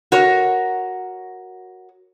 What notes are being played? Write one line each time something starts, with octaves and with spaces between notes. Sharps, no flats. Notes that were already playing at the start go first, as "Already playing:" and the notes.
F#4 A#4 C#5